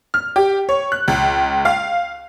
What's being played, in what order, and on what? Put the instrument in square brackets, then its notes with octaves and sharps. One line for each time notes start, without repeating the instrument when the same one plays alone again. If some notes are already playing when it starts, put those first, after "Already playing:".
[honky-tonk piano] F6
G4
C#5
F#6
C#2
F5